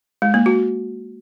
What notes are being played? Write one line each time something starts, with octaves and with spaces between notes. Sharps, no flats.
G#3
A#3
F#4